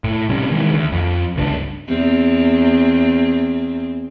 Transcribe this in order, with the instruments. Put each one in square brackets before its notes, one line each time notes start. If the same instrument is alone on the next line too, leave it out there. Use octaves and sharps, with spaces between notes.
[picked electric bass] A2
C3 G3 C#4
D#3 E3 G#3
D2
F2
G1 C#2 C4 D4
[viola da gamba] E2 C4